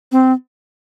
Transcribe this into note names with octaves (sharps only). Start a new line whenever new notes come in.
C4